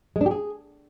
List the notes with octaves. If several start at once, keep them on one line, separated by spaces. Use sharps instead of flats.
G#3
D4
G4
G#4